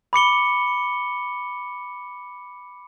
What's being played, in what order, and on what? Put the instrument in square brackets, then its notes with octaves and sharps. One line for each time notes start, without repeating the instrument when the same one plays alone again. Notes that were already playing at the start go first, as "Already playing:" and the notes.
[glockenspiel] B5 D6 C#7 G7